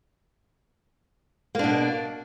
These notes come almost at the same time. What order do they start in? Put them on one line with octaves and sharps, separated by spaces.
A#3 D4 B2